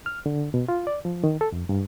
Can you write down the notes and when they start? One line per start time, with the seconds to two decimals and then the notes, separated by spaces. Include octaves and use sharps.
0.06 F6
0.26 D3
0.54 B2
0.69 F4
0.87 D5
1.05 F3
1.24 D#3
1.41 A4
1.52 F2
1.69 G2